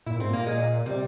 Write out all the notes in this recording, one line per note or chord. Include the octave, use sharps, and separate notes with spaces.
A#2 E4
G#2 C4
A#2 A#3
G#3
C3 G3